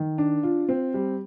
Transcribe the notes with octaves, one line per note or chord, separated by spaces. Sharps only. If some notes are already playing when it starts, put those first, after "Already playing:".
Already playing: D#3
D4
F4
C4
G3